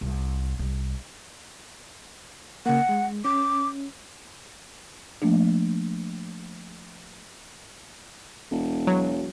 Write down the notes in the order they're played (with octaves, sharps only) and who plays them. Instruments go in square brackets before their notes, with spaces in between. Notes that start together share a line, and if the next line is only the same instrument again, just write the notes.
[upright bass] C2
C2
[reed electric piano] C#3 A#3 [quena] F#5
[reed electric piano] G#3
[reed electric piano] C#4 [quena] D6
[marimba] F3 A3 A#3 D4
[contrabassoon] E1
[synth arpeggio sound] F#3